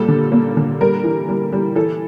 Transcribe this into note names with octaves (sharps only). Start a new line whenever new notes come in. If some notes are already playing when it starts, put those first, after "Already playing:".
Already playing: A#2 G3 A4
D3
A#3
D3
G3 A#4
E3
G3
G3
E3 A4